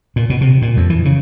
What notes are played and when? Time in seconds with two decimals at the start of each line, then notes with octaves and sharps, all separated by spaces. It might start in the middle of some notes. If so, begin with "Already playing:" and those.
0.16 A#2
0.30 B2
0.41 C3
0.62 A#2
0.77 F2
0.90 E3
1.05 C#3